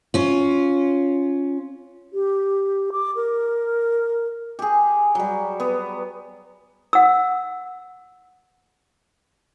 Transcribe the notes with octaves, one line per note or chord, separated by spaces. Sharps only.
C#4 F4
G4
D6
A#4
G4 G#4
F#3 G3
B3
F#5 E6